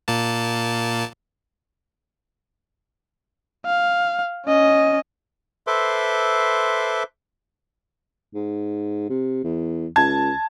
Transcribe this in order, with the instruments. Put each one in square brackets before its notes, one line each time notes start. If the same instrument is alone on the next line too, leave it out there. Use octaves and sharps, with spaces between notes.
[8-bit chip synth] A#2 A#3 A5
[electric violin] F5
C#4 D#5
[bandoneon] A4 B4 C5 E5 C6 D6
[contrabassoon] G#2
C3
E2
[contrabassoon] C#2 [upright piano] A5 G#6